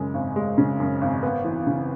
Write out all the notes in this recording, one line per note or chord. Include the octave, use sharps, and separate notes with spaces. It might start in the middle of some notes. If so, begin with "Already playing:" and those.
Already playing: F#2 C#3 G#3
G#1
G#3
C#3
F#2
G#1
B3
E3
C#3